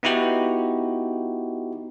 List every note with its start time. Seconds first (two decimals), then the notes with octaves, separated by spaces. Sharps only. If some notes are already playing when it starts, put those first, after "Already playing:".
0.03 B3 D#4 E4 F#4 G4